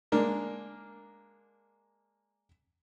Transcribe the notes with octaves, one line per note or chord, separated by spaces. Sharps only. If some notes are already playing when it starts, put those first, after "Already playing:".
G#3 A#3 D4 A#4